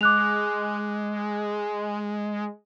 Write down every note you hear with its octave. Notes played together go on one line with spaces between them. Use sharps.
G#3 D6 F#6 F7